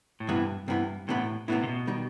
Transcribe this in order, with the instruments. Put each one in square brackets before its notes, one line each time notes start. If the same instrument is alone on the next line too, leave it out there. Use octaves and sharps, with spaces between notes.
[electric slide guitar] A2
[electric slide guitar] G2 [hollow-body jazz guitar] C3 E3 B3 E4
[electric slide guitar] G2 [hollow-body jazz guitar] C3 E3 B3 E4
[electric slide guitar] A2 [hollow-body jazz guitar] C3 E3 B3 E4
[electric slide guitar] A2 [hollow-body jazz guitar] C3 E3 B3 E4
[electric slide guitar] C3
B2
[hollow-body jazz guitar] D#3 G3 D#4